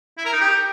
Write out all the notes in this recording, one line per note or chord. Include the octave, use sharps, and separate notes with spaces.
E4
A#4
D#4
G4